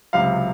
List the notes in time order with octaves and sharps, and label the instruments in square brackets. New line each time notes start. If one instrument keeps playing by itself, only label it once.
[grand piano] C#2 C3 F#3 F5